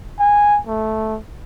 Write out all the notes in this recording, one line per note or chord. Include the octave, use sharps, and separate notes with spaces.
G#5
A3